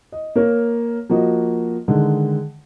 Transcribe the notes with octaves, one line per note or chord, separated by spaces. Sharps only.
D#5
A#3 A#4 C#5
F3 A#3 F#4 D#5
D3 D#3 G#3